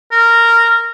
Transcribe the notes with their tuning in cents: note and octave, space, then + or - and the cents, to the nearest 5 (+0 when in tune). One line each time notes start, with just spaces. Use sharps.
A#4 -10